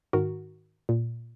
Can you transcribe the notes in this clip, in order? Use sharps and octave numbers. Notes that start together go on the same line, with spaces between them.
G#2 D#3 F#4 A#4
A#2